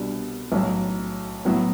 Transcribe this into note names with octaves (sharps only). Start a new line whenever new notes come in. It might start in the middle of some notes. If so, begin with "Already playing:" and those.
Already playing: C2 B2 G3 D4
B1 A2 F#3
A2 F#3 B3 E4